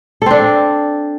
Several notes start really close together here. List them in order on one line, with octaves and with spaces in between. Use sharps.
A4 C4 D4